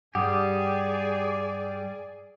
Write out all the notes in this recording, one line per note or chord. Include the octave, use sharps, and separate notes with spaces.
G2 G3 G4 G#4 D5 F#5 D6 D#6